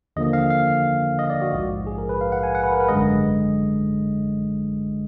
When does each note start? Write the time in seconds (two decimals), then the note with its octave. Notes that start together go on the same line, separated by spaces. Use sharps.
0.16 D#2 D3 F3 A#3 D#5
0.33 F5
0.50 F5
1.19 D#5
1.30 D5
1.42 F#4
1.53 A#1 G#2 F3
1.87 G#4
1.98 A#4
2.09 B4
2.21 F5
2.32 F#5
2.43 G#5
2.55 F#5
2.63 B4
2.72 A#4
2.80 B4
2.89 G#1 F#2 D3 G#3 D#5